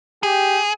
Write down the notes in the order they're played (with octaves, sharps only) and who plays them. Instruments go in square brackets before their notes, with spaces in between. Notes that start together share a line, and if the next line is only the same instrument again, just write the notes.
[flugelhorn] G4 [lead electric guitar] G#4